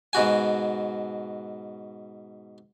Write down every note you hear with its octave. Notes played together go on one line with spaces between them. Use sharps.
G#2 B2 F#4 G#5